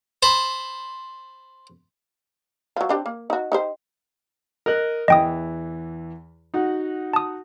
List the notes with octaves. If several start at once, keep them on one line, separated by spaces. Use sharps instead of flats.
C5 A5 B5
F3 F#3
C4 D4 G4
A#3
D#4 F#4
D#4 G4 C5
A#4 D#5 F#6
E2 E3 D#5 G5 D#6
D#4 F#4 F#5
A5 D#6